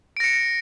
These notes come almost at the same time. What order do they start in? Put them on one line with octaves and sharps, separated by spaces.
D7 A#6 C#7